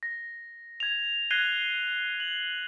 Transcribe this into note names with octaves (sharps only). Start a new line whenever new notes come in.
A#6
G#6 F7
F#6 G#6 A#6 C7 D#7 G7
F#7